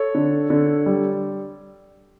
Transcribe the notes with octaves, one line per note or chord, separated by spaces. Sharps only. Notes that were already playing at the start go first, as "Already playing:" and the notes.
Already playing: A4 C#5
D3
D3
G3